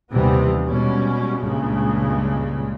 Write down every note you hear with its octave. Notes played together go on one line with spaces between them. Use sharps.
D#2 C3 E3 G3 B3
B2 G3 G#3 C#4
C#2 G2 A#2 C#3 G#3